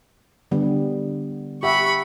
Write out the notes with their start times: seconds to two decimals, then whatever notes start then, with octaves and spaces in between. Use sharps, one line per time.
0.51 D3 G3 B3
1.63 G4 E5 F#5 B5 C#6